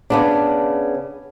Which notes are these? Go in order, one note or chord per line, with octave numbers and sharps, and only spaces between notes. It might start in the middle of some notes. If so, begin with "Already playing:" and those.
C#3 B3 D4